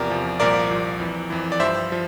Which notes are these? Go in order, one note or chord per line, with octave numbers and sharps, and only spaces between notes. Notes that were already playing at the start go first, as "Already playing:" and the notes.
Already playing: E2 C3 F3 A#4 D5
E2 C3 F3
C2 A#2 F3 A#4 D5
C2 A#2 F3
F2 E3
F2 E3
D5
G2 F3 C5 E5
F3